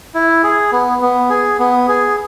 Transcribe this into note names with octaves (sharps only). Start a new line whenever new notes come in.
E4
G#4
B3
B3
G#4
B3
G#4